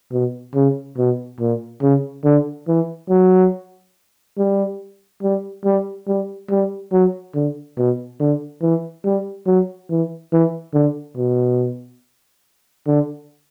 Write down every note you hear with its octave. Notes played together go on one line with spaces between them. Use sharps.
B2
C#3
B2
A#2
C#3
D3
E3
F#3
G3
G3
G3
G3
G3
F#3
D3
B2
D3
E3
G3
F#3
E3
E3
D3
B2
D3